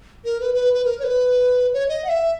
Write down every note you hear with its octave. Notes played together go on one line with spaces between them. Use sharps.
A#4
B4
B4
B4
A#4
C#5
B4
C#5
D#5
F#5
E5